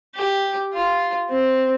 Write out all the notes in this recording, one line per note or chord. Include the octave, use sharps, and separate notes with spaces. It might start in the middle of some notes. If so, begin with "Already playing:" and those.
G4
F4
C4